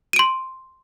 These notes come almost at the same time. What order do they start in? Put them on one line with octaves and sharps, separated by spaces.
D#7 D7 C6